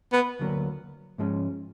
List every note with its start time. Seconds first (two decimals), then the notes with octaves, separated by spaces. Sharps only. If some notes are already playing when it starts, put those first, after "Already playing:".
0.13 B3
0.39 D2 D3 F#3 A#3
1.18 G#2 F3 G#3 C#4